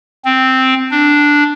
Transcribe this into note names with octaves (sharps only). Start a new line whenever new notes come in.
C4
D4